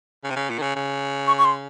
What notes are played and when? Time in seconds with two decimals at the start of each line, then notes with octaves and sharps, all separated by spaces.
0.24 C#3
0.30 C3
0.36 C#3
0.50 A#2
0.59 D#3
0.62 C#3
0.75 C#3
1.27 C#6
1.38 C#6
1.45 C6